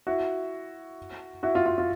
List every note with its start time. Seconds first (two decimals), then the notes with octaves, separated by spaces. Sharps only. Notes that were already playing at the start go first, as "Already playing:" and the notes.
0.07 E4 F#4
1.43 E4 F#4
1.55 F4
1.66 F4
1.78 F4